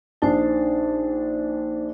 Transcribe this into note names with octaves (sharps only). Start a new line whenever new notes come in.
A#1 D4 D#4 C5 A5